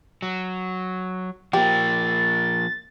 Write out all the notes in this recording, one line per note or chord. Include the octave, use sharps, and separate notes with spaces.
F#3
F3 A#3 G4 A6